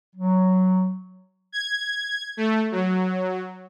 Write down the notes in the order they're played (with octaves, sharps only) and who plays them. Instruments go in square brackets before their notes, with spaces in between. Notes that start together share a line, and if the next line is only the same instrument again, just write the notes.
[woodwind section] F#3
[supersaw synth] G#6
A3
F#3